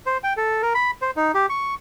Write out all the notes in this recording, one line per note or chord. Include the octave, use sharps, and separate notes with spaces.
C5
G5
A4
A#4
B5
C5
D#4
G4
C#6